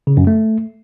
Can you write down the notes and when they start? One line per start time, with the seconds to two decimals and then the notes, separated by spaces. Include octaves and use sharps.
0.07 C#3
0.17 F#2
0.27 A3